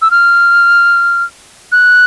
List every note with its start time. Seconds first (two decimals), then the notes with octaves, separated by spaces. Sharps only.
0.02 E6
0.11 F6
1.72 F#6